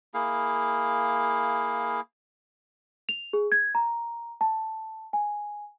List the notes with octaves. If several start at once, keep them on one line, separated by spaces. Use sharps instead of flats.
A#3 E4 G#4 F5
F7
G#4
G#6
A#5
A5
G#5